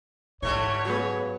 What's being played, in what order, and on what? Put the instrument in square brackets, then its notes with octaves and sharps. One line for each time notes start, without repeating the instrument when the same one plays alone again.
[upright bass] G#2 [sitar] D3 E3 G3 [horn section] C#5
[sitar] C#3 [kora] F#3 B3